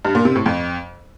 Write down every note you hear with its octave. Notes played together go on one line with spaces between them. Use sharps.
G2
A#2
C3
A2
F2